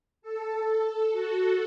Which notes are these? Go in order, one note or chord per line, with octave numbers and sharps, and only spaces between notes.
A4
A4
F#4